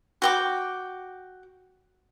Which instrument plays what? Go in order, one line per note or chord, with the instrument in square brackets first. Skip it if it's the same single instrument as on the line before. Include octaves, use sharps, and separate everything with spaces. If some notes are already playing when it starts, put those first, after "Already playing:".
[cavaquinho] F#4 G5 D6